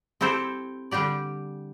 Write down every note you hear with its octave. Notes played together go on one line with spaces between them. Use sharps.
C4 E4 G4 A4 C5
D3 G3 D4 G4 D5